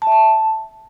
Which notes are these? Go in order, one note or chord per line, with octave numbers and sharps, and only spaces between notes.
A5
E5
A5